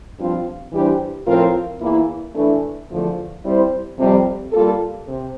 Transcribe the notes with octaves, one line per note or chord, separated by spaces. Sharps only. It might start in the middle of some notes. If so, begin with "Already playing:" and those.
G2 F3 C4 F4
E3 G3 D4 G4 C5
A2 F3 C4 F4 A#4
E2 E3 A#3 E4
E3 A3 D4
E2 D3 F3 A3 D4
G3 C4 E4 G4 C5
F2 C3 G3
G3 A#3 F4 A4
C3